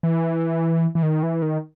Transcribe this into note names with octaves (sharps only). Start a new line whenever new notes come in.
E3
E3
D#3
E3
D#3